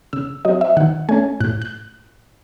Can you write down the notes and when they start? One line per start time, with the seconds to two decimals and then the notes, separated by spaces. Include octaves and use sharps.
0.13 C#3 E6
0.45 F#3 C4 D#5
0.61 E5
0.77 D#3 F#5
1.09 A3 C#4 G#5
1.40 A2 F#6
1.62 F#6